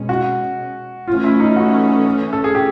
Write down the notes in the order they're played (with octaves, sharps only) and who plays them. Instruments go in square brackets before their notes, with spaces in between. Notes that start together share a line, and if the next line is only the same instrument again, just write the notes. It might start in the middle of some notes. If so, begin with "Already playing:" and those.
Already playing: [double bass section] B2 G#3 C#4
[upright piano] F#4
[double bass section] E3 A3 C#4 [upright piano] F4
[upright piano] E4
D#4
F#4
A4
G#4
G4